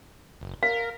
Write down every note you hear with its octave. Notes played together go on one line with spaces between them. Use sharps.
F#1
A#4 F5